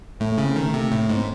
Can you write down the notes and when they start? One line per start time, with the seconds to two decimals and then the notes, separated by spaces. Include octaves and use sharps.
0.20 A2 A3
0.32 A3
0.38 C#3
0.44 C4
0.56 D#3 A3
0.73 C3 A3
0.91 A2 A3
1.10 G#2
1.17 C4